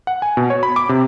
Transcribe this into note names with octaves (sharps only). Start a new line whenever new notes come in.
F#5
G#5
B2
C#5
B5
D6
C3